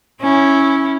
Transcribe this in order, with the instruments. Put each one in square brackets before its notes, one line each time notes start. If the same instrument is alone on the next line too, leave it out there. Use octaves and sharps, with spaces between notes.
[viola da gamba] C#4 E4